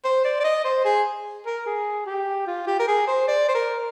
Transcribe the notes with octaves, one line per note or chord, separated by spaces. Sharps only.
C5
D5
D5
D#5
C5
G#4
A#4
G#4
G4
F4
G4
A#4
G#4
C5
D5
C5
A#4